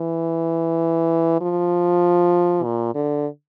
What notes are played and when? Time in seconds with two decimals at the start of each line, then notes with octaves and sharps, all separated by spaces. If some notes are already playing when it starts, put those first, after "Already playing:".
Already playing: E3
1.41 F3
2.64 A#2
2.95 D3